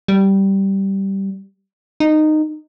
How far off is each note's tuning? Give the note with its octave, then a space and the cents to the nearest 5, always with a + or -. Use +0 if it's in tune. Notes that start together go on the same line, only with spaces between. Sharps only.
G3 -10
D#4 -15